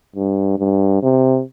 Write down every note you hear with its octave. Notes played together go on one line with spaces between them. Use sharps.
G2
G2
C3